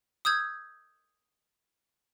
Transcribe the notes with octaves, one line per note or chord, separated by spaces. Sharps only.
D#6 E6 G6 G#6